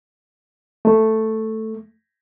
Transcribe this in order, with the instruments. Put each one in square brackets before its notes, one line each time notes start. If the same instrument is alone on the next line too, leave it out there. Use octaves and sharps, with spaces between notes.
[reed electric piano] A3